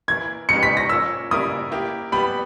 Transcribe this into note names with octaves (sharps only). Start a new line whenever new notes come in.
E3 A#3 E4 G#6
C#3 G#3 D#4 G4 B4 C#7
B6
A#6
A#2 A#3 C#4 E6
C#3 G3 A#3 E4 A#4 D#6
A#3 E4 G4
G3 B3 G4 B5